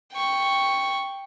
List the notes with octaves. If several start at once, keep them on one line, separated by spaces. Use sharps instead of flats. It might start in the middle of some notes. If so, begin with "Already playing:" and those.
G5 C#6